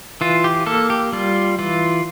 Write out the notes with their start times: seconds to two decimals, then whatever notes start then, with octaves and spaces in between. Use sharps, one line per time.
0.21 E3 F4
0.44 G4
0.66 A#3 A4
0.90 G4
1.12 G3 F4
1.59 E3 F4